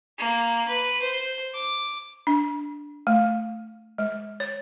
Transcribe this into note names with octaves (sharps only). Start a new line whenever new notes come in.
A#3
B4
C5
D6
D4
A3
G#3
C#5